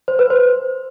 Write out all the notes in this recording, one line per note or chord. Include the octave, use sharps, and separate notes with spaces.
C5
B4
C5